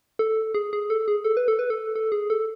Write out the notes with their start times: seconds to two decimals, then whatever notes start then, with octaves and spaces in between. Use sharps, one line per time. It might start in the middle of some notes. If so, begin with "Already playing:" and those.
0.19 A4
0.54 G#4
0.73 G#4
0.90 A4
1.08 G#4
1.24 A4
1.37 B4
1.48 A4
1.59 B4
1.70 A4
1.96 A4
2.12 G#4
2.30 A4